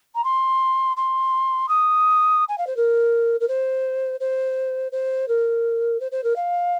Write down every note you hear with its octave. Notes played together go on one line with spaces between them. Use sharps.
A#5
C6
C6
D#6
G#5
F5
C5
A#4
A#4
C5
C5
C5
A#4
C5
C5
A#4
F5